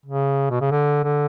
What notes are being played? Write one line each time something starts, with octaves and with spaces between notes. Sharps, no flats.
C#3
B2
C#3
D3
D3